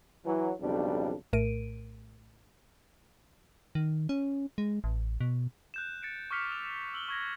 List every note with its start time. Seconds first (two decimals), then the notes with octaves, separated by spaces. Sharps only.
0.25 E3 F#3
0.61 B1 F2 C#3 G3 D4
1.33 A#1 A2 A3 A#4 D7 D#7
3.75 D#3
4.09 C#4
4.58 G#3
4.84 A1
5.21 B2
5.74 F#6 G6 E7
6.02 A6 C#7 D7 E7
6.31 C#6 D6 F6 B6 C#7 F7
6.48 E6 F7
6.93 E6 F#7 G7
7.08 C#6 G#6 A#6